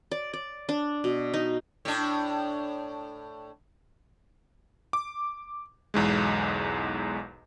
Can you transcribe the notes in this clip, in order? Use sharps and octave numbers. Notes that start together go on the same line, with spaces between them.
D5
D5
D4
B2
D#4
A2 D4
D6
B1 E2 G#2 G#3